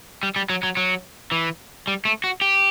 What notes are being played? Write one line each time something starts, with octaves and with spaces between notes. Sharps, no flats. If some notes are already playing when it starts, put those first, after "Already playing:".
G3
G3
F#3
F#3
F#3
E3
G3
A3
F#4
G4